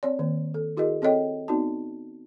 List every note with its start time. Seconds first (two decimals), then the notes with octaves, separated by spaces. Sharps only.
0.03 C4 C#5 D5
0.19 D#3 A#3
0.54 A4
0.77 E4 F#4 G#4 A#4 D#5
1.02 C4 A4 C#5 D#5 G5
1.48 B3 C4 D#4 F#4 D5 A5